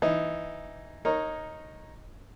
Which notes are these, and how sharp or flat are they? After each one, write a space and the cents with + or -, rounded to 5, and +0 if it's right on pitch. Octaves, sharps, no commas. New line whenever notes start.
E3 +0 D#4 +0
D#4 +0 A#4 +0 C#5 -20